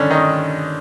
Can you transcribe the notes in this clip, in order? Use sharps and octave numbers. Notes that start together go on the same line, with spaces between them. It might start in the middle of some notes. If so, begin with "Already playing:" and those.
Already playing: G2 D3 D#3 C#4 D4
D#3 D#4